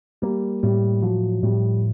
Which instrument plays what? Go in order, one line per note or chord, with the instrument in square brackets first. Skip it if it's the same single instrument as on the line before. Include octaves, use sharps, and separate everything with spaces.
[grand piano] G3 [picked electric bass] A#3
[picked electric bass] A2 [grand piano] G3
[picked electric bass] F3 [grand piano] F#3
[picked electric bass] A2 [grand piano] G3